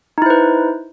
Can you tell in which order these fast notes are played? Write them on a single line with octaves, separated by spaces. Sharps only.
D#4 E4 C5 B4